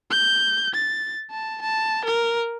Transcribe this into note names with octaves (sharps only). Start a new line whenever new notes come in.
G6
A6
A5
A5
A#4